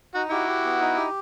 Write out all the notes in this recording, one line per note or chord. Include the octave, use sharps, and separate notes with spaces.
D#4 F#4
E4 F#4 G4
G4
B3
D#4
G4